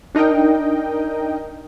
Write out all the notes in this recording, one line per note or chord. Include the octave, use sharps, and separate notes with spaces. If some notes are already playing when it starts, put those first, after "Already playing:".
D4 D#4 A#4 D#5 G5